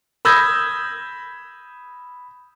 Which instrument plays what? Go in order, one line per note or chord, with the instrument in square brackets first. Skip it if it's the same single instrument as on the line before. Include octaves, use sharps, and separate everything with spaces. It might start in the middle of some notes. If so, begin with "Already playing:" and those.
[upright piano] B5 D#6 E6 G6 G#6 A#6